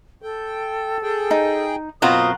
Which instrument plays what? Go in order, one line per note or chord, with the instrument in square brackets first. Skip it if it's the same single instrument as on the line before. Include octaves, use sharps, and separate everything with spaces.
[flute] A4 [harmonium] G5
[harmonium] G#4 G5
[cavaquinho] D#4
[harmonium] F#2 [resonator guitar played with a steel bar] B2 C4 F4 [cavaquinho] F#5 A#5 [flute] D#6